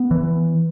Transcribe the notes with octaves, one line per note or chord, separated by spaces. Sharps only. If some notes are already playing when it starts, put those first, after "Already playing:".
Already playing: B3
E3